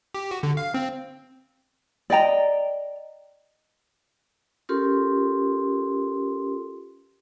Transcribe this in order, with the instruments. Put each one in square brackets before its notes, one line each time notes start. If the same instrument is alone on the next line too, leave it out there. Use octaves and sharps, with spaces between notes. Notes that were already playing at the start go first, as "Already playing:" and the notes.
[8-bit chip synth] G4
F#4
D3
F5
C4
[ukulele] D5 D#5 G5 A#5
[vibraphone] C#4 F4 G4 A4 A#4 C6